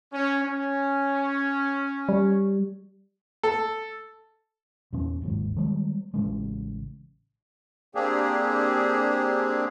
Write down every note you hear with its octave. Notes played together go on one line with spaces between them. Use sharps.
C#4
C#4
G3
A4
E2 A#2 C#4
G1 D#2 G#2
D#3 G3 G#3
A1 C#3 G#3
A#3 C4 D4 G4 G#4